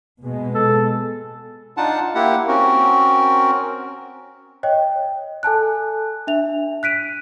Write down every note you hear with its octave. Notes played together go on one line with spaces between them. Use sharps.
B2 G#3 B3
A4
D4 D#4 F4 F#5 A5
A#3 E4 G4 F#5
C4 C#4 F#4 A#4
C#5 D#5 G5
A4 G#5 A5 F#6
D4 E5 F7
F#6 B6 D7 D#7